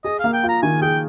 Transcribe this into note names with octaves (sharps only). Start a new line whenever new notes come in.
G#4 D#5
A#3 F5
G5
F4
A#5
D#3 G#5
G#4 G5